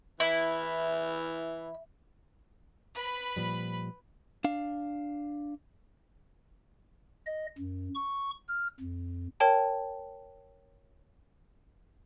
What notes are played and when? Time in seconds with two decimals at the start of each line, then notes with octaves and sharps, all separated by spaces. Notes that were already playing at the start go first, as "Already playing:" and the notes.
0.20 E3 E4
2.94 B4 B5
3.36 A#2 F3 G3
4.45 D4 F5
7.27 D#5
7.58 F#2
7.95 C#6
8.48 F6
8.80 F2
9.40 A#4 C#5 G5 A5